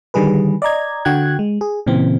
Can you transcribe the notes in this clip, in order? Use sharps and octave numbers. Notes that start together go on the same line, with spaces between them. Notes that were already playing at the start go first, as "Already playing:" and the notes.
D3 D#3 G3 G#4 B4
D5 D#5 A#5 G#6
D3 F#4 G5 F#6 G#6
G#3
G#4
A#2 C#3 E3 C4